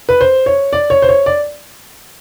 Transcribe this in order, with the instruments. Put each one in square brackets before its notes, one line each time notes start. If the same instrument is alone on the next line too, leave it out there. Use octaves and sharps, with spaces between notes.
[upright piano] B4
C5
C#5
D5
C#5
C5
C#5
D5